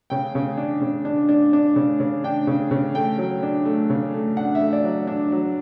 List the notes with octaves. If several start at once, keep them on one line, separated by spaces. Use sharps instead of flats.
C#3 G5
C#3
D4
C#3
D4
D4
D4
C#3
C#3
D4 G5
C#3
C#3
A3 G5
F#3
D4
A3
C#3
A3
D4 F#5
E5
A3
D5
F#3
D4
F#3